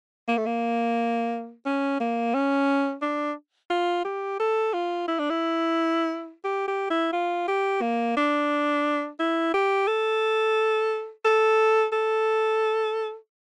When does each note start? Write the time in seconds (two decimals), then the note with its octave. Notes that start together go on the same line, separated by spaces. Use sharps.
0.28 A#3
0.37 A3
0.46 A#3
1.65 C#4
2.00 A#3
2.34 C#4
3.02 D4
3.70 F4
4.05 G4
4.39 A4
4.73 F4
5.08 E4
5.19 D4
5.30 E4
6.44 G4
6.68 G4
6.90 E4
7.13 F4
7.48 G4
7.81 A#3
8.17 D4
9.19 E4
9.54 G4
9.87 A4
11.25 A4
11.92 A4